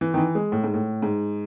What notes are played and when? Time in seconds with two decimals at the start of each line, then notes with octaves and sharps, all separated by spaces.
0.01 E3
0.14 D#3
0.17 E3
0.35 G#3
0.52 A2
0.64 G#2
0.74 A2
1.02 G#2